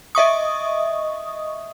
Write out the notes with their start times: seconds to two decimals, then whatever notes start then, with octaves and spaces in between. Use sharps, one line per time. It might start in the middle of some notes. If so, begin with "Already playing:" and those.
0.15 D#5 E5 C#6 D#6